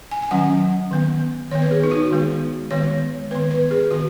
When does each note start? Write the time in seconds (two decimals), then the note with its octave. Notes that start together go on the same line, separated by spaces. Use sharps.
0.11 G#5
0.22 G#5
0.31 D#3 F#3 C#4 F#5
0.91 D#3 B3
1.51 D#3 B3 C#5
1.62 B4
1.71 G#4
1.84 D#4
1.91 F#4
2.11 D#3 G#3 B3
2.71 D#3 G#3 B3 C#5
3.31 D#3 B3 B4
3.51 B4
3.71 G#4
3.91 D#3 B3 F#4